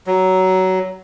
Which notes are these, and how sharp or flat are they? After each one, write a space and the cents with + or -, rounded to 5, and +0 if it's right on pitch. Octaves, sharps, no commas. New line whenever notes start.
F#3 +15